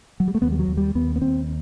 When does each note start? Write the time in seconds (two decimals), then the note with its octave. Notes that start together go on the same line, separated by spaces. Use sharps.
0.20 F#3
0.28 G3
0.35 A3
0.42 D#2 B3
0.52 G3
0.59 F#3
0.68 D#2
0.77 G3
0.95 D#2 B3
1.16 B3
1.22 D#2 C4